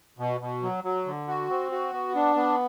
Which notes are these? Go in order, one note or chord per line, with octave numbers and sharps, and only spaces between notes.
B2
B2
F#3
F#3
D3
F#4
C4
F#4
B3
D4
B3